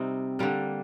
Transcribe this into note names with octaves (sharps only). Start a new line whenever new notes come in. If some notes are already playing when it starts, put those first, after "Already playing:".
Already playing: C3 G3 C4 D#4
D3 G3 A#3